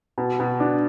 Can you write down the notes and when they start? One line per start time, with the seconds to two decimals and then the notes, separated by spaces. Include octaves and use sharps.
0.18 B2
0.40 B2
0.60 D4